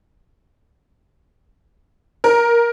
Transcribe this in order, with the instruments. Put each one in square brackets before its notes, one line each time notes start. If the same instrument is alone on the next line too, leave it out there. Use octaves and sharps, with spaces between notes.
[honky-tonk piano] A#4